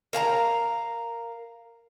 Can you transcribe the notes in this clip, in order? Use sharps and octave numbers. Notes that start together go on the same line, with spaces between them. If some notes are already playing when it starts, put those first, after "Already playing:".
A#4 F5 A5 A#5